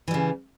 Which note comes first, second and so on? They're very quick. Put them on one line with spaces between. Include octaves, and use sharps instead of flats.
E3 G3 C#3